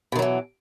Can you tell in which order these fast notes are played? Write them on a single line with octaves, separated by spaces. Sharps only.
B2 D#3 F#3 E3